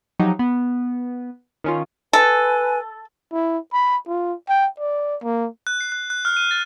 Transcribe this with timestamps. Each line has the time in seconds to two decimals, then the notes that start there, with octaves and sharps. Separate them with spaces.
0.19 F3 F#3 D#4 G4
0.39 B3
1.64 D#3 C#4 F4
2.13 A4 B4 G#5
3.33 E4
3.73 B5
4.07 F4
4.49 G5
4.80 D5
5.23 A#3
5.67 F#6
5.81 C7
5.92 F#6
6.10 F#6
6.25 F6
6.37 D#7
6.51 A6